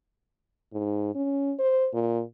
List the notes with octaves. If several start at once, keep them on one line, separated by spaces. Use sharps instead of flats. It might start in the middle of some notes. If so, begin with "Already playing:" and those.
G#2
C#4
C5
A#2